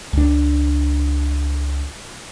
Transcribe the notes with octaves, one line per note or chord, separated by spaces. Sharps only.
C#2 D4